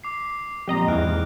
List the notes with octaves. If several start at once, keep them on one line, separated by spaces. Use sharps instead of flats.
D6 C7
F2 A#2 G4 D#5 A#5
E2 G#2 E3 F6 F#6 D7